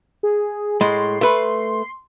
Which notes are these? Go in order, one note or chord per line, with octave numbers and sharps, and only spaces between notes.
G#4
A2 G#3 C6
A3 B4